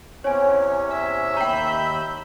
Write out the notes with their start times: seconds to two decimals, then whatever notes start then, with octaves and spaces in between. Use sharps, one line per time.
0.24 E2 C3 C#4 C#5 G#5
0.93 E5
1.37 D#2 G5 A#5 B5 G6